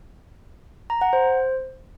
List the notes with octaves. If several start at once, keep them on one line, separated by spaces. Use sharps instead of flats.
A#5
F#5
C5